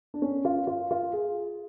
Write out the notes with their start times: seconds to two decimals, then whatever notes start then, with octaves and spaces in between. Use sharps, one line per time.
0.14 D4
0.22 C#4
0.45 F4
0.67 F4
0.91 F4
1.13 G#4